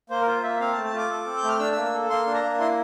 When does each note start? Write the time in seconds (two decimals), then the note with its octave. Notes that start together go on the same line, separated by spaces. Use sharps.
0.10 A#3 C5
0.22 A#4
0.26 F4 C5
0.43 A#3 E5
0.60 C4 F5
0.73 A5
0.77 A3
0.85 A5
0.94 F4 D6
1.10 A4
1.26 C4
1.37 G6
1.44 A3 F6
1.59 D4 E6
1.72 E6
1.77 A#3
1.85 E6
1.93 A4
2.10 A#3 C6
2.26 D4
2.34 A#5
2.43 A#3
2.59 E4 C6